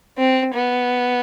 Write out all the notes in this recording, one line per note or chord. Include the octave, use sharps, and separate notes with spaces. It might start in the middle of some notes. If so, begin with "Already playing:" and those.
C4
B3